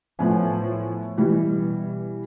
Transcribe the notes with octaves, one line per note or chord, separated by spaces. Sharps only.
A2 F3 B3 G#5
B2 E3 G3